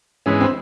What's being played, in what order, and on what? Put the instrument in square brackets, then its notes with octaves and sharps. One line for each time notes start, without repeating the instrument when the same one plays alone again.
[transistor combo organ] G#2 E3 G#3 B3 [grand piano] C#4
[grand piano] C4